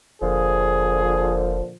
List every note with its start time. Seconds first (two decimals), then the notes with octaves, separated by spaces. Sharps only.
0.22 F1 A#2 D3 F3 G#4